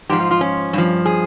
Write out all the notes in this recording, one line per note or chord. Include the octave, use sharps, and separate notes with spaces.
G#2 F3 G4
F4
F4
C#4
G2 F3
G#4